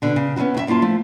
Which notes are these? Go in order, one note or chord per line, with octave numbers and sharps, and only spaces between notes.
B2 D3
C#3
B3 C#4 D#4 E4 F#4
F2 F#4 E5
F#2 A#3 E4 F4 A5
F3 A3